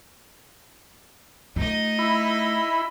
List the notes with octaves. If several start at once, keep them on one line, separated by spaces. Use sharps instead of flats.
A3 D#4 F4 D#5
E4 B5